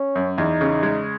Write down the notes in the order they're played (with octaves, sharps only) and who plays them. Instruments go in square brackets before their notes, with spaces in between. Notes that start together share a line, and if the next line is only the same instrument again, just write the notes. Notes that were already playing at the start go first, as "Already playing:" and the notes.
Already playing: [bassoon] C#4
[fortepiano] F#2
[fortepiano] E2 [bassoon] D#4
[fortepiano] C#3
G#3